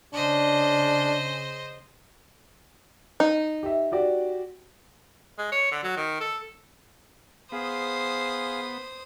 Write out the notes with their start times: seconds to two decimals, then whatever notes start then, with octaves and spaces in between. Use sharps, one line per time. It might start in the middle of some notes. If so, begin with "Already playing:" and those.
0.14 C#3 D4 C5 D#5
3.20 D#4
3.63 G4 E5
3.92 F#4 G4 D5
5.39 G#3
5.52 C#5
5.72 D3
5.84 F#3
5.97 D#3
6.20 A4
7.52 B3 G#4 C5 F5 D#6